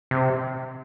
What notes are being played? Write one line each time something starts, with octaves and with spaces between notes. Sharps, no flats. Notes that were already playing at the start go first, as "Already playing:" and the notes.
C3